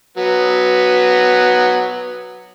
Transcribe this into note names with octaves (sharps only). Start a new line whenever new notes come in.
F#3 B3 B4